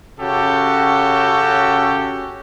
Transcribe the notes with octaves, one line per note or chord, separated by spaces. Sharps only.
C#3 C#4 F#4 G4 A4